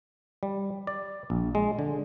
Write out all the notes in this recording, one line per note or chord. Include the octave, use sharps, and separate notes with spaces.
G3
D5
A#1
G#3
D3